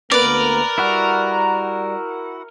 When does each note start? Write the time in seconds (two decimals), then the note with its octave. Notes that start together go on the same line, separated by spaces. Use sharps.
0.12 D2 A#3 B3 A#4 B4 D5
0.78 G3 E4 F#4 F#5